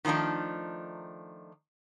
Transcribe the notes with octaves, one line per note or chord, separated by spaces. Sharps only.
D#3 F3 A3 D4 D#4